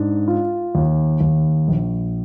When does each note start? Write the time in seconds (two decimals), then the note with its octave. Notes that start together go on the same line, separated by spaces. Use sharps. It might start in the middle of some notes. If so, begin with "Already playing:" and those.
Already playing: G#2 D4
0.28 F4
0.75 D#2
1.21 D#2
1.68 A#1